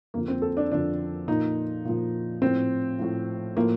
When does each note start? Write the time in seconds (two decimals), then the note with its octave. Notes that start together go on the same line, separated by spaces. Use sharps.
0.14 F2 D3 F3 A#3
0.28 C4
0.42 A4
0.57 D4
0.72 F2 D3 F3 D4
1.27 A#2 F3 D#4
1.85 A#2 F3
2.42 A2 F3 C4
2.99 A2 F3
3.57 A2 F3 A#3